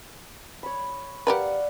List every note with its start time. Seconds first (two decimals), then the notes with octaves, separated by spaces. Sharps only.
0.63 C#5 B5
1.27 G4 A#4 B4 D5 F5 F#5